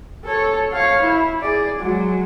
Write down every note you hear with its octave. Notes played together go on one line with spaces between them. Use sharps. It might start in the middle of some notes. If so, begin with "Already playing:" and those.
A4 C#5
C#5 F5
E4
G#4 D5
F#3 G#3